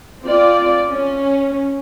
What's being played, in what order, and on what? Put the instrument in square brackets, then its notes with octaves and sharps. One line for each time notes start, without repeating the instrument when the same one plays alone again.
[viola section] C4 F4 D5
C#4